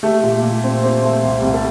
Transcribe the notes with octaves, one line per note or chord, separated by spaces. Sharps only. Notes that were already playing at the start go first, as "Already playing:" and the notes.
A3 G4
A#2
A#2
C4
C4
A3
C2
C2
A4